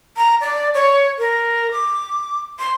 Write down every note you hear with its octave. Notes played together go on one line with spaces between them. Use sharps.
A#5
D5
C#5
A#4
D6
C6